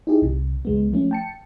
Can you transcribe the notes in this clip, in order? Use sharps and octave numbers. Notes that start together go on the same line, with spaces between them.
D#4 E4 G4 G#4
C2 C3
C#2 G#3 B3
F3 A3 C#4
G5 A5 C#7